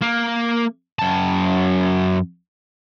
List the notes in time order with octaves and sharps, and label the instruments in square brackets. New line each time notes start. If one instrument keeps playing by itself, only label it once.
[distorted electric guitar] A#3
F#2 A5